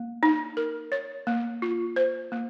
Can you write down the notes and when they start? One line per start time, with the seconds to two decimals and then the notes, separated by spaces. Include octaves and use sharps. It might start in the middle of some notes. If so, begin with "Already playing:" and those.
Already playing: A#3
0.23 D#4
0.57 A#4
0.92 C#5
1.27 A#3
1.62 F4
1.96 C5
2.32 A#3